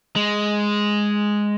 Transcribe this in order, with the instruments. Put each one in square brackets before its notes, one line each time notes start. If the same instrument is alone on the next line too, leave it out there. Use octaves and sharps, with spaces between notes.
[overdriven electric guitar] G#3